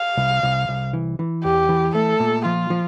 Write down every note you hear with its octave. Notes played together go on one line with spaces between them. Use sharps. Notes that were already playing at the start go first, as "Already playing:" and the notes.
Already playing: F5
C2
C2
C2
E3
E3
E2 G4
E3
A3 A4
A#2
F3 F4
F3